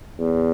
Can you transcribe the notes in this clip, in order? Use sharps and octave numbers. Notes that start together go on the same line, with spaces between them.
E2